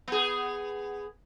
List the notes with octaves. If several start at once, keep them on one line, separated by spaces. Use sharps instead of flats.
B3 G#4